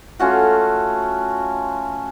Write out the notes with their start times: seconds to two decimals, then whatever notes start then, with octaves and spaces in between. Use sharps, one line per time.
0.19 A3 C#4 F4 F#4